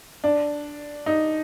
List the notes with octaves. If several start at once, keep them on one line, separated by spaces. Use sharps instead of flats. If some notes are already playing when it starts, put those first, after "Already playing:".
D4
D#4